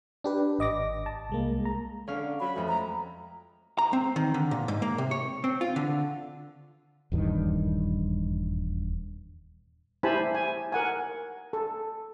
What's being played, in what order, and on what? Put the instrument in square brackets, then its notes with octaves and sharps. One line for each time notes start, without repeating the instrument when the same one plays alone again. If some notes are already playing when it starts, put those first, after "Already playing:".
[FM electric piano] D4 G4 B4
G#1 D#5 D6 A#6
A5
C2 G#3 A#3
A#5
[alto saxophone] D3 [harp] C#4 F5
[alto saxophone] F#3 [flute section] B5
[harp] F2 G#3 [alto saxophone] A3
[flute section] A#5
[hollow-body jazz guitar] A#5
C4
D#3
D3
A#2
G#2
A#3
C3
C#5
C4
F4
D3
[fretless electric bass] D#1 E2 G2 D#3
[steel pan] E4 G4 C5 G#5 A5 B5
G#5
A#4 F#5 G#5
A4